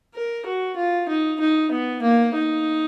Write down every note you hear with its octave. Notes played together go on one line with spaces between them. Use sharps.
A#4
F#4
F4
D#4
D#4
B3
A#3
D#4